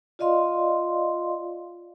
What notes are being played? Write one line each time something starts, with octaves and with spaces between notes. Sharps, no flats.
F4 D5 D#5 F5 C6